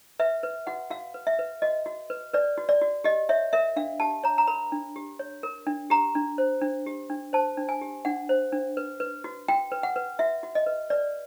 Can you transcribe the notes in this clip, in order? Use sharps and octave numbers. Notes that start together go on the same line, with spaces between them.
B4 E5
B4
F#4 F#5
F#4 F5
B4
E5
B4
F#4 D#5
F#4
B4
B4 D5
F#4
D5
F#4
G4 D#5
C#5 E5
A#4 E5
D4 F5
G4 A5
C#5 A#5
A#5
A#4 B5
D4
G4
C#5
A#4
D4
G4 A#5
D4
C5
D4
G4
D4
C5 A5
D4
G#5
G4
D4 F#5
C5
D4
B4
B4
F#4
F#4 G5
B4
F#5
B4
F#4 E5
F#4
D#5
B4
B4 D5